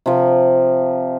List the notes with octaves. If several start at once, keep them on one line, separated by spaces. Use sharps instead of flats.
C3 F3